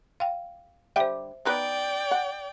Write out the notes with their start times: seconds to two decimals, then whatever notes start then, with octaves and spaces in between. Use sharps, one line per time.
0.20 F5 G5
0.96 D3 G3 C5 E5 G5
1.45 B3 D#4 B4 D5 G5
2.11 F#5